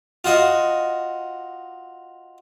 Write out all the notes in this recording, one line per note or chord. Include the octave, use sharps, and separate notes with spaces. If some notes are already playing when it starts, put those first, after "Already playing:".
F4 F#4 D#5